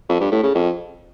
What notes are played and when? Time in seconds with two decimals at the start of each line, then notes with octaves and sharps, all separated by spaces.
0.09 F2
0.20 G2
0.32 A2
0.43 C#3
0.55 F2